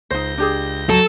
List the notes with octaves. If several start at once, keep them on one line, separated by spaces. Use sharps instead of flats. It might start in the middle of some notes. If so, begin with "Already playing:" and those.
C#2 D#4 C5 G6 A#6
D4 G4 G#4
F#3 A4